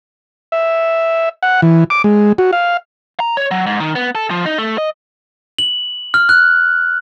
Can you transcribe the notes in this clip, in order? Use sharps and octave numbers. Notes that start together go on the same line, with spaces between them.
E5
F#5
E3
D6
G#3
F#4
F5
A#5
C#5
F#3
G#2
D#3
B3
A4
F3
D#4
A3
D#5
F#7
F6
F#6